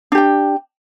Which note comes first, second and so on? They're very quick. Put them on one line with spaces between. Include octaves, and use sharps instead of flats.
D4 G4 G5